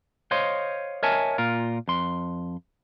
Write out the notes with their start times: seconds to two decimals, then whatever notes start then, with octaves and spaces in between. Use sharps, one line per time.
0.31 C5 C#5 D#5 F5 C6
1.03 A#4 C#5 D#5 E5 G#5 A5
1.38 A#2 F4 A#4
1.88 F2 C6